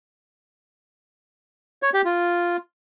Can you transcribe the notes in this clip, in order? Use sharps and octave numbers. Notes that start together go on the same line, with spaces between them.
C#5
G4
F4